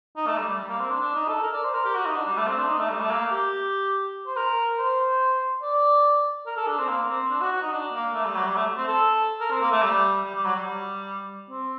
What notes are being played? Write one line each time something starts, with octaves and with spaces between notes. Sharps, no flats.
D#4
A3
G3
G3
G3
A#3
C4
D4
D4
D#4
A4
A#4
D5
C5
A#4
G4
F#4
D#4
D4
G3
A3
C4
D4
D#4
A3
G3
A3
A#3
G4
C5
A#4
C5
D5
A#4
A4
D4
C4
A#3
C4
D4
F#4
F#4
D#4
D4
A#3
A3
G3
F#3
G3
A3
C4
A4
A#4
C4
A#3
A3
G3
G3
G3
F#3
G3
C4